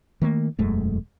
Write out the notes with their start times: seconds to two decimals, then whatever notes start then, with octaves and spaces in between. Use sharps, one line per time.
0.22 D#3 A3 A#3
0.59 E1 F#2 G#3 A3